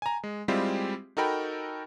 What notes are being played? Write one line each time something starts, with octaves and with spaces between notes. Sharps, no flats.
G#5 A#5
G#3
G3 G#3 C4 E4 F4 G4
D#4 F#4 A4 A#4 G5 B5